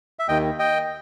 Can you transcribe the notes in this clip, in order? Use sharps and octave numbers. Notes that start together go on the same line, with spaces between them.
E5
D#2 D#3 D#5 G5
D#5 G5